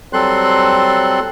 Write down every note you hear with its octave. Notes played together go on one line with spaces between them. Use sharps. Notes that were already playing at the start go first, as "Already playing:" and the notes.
F#3 G3 C4 A4 C6 F#6